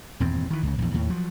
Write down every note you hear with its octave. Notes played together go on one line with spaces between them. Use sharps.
D#1 E2 G2 C4
D#3 E3
C#2 C#3
A#1 E2
D#2 A2
F3 F#3